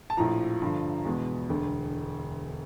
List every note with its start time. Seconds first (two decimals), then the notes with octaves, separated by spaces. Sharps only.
0.10 A5
0.17 A#1 A2 F3 A#5
0.62 G2 D3 F3
1.05 E2 B2 G#3 B3
1.49 E1 D2 D3